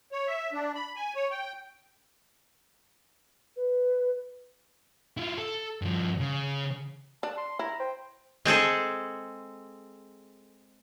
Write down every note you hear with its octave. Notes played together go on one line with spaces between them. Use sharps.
C#5
E5
D4
B5
G#5
C#5
G5
B4
E4 F4
A4
G2 F3
C#3
D4 A5
C6
E4 A#5
C5 G5
G#3 C4 G#4 A4